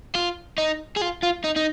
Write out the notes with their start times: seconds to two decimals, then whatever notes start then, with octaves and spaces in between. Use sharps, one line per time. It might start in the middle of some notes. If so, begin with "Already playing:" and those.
0.15 F4
0.58 D#4
0.96 G#4
1.01 F4
1.23 F4
1.44 D#4
1.56 D#4